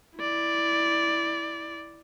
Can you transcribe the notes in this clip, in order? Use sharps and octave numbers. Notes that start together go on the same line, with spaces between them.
E4 D5